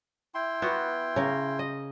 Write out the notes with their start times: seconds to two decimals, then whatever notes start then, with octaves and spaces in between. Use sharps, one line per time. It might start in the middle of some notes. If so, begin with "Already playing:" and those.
0.35 E4 G5 C6
0.62 B3 F#4
1.16 C#3 A#4
1.59 D#5